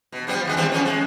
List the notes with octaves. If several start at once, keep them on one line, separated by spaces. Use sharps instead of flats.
B2
F3 G3 B3
D#2 E3 G#3
G3 B3 C4
F3 C#4
G#3